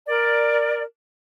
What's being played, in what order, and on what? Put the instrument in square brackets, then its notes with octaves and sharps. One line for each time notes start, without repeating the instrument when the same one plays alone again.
[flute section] A#4 D5